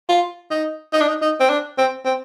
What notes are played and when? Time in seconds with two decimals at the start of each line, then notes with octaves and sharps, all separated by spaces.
0.09 F4
0.51 D#4
0.93 D#4
1.01 D4
1.09 D#4
1.22 D#4
1.40 C4
1.50 D4
1.78 C4
2.05 C4